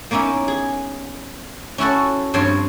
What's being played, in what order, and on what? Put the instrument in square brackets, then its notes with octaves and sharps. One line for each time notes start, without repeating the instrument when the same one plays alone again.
[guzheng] A#3 B3 C#4 D#4 E4
G#4
C#4 E4 F#4 A4
G2 F3 C4 C#5 C6